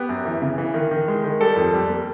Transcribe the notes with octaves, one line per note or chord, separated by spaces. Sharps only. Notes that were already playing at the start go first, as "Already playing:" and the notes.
Already playing: B3 G4
F#2
E3
C#3
E3
D#3
D#3
G#3
D#3
G3 A4
F2
G3
A#3